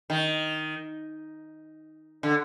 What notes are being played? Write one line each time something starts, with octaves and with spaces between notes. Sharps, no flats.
D#3
D3